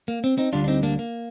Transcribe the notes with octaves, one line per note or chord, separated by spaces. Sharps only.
A#3
C4
C4 D#4
D2 D3 G3 D4 F4
D4
C4 D#4
A#3 D4
A#3